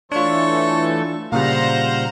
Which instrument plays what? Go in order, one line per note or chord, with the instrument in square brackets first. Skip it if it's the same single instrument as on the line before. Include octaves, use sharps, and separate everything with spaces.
[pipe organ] E3 A3 A4 [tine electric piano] D4 F4 [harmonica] C#5 C#6
[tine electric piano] A#2 C#3 G3 [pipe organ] C5 A#5 [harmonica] F5 F#5